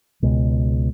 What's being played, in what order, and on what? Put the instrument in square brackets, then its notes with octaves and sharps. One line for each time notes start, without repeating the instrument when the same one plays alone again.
[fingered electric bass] C#2 B2 G#3